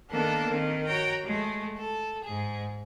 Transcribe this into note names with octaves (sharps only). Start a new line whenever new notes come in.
D#3 A#3 B3 D4 A4
D#3 C4
F#4 C#5 G5 A#5
G#3 A3
A4
G#2 G#4